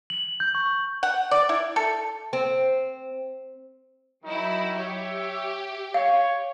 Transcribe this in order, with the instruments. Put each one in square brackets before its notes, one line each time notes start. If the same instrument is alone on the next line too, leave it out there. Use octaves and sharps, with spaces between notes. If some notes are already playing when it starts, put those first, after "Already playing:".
[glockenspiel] F#7
G6
C#6
[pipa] F#5
D5
E4
A4
[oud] C4
[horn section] D#3 D#4 [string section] F#3 E4
[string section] G4 [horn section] C#5 E5
[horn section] C#5 [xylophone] F5